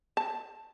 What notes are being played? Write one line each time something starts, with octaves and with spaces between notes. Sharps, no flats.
A5